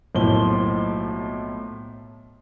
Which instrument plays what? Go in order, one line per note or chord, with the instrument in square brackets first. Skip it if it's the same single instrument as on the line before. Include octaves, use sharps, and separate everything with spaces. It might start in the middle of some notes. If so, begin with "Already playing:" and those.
[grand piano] B1 A2 F3 A#3 G7